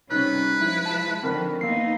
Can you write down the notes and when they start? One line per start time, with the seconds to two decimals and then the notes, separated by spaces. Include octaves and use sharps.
0.11 C3 G3 C#4 D#4 B4 F#6
0.57 F3 G#3 E4
0.86 A5
1.23 D3 D#3 F3 C4 A#4 B5
1.61 A#3 B3 D#4 C7